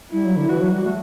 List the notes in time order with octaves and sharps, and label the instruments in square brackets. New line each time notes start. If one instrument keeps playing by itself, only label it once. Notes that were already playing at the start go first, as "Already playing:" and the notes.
[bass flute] G3 [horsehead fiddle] E4
[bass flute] F#3
D3
[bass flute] E3 [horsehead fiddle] F#4
[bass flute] F#3
G3
A3